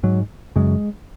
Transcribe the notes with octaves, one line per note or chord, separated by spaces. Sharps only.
G#2 F#3
F#2 C#3 G#3